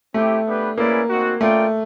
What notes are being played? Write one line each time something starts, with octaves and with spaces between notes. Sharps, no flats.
A3 C4 E4 G4
B3 D4 G4 B4
A#3 C#4 E4 G#4 B4 D5
C4 D#4 F#4
A3 C#4 F4 A#4 D5 G5